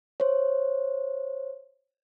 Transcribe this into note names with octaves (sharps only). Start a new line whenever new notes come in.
C5 C#5